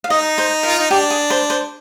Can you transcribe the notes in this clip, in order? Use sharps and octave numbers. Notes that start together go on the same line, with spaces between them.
F5
D#4 D#5
C5
A#4
F4
D#4
D4 G4
G#4
C5
C5